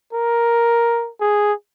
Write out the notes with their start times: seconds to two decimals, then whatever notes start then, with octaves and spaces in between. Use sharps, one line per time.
0.13 A#4
1.20 G#4